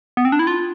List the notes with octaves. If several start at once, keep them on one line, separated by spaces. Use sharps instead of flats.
B3
C4
D4
E4
F4